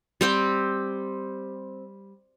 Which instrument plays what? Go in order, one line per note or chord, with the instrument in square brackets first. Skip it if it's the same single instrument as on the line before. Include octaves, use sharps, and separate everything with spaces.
[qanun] G3 C4 G4